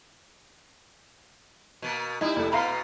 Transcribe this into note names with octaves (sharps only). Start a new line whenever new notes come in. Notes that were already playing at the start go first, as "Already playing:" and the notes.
B2 A#3
G3 D#4 E4
F1 A3
B2 B3 F5 A#5 B5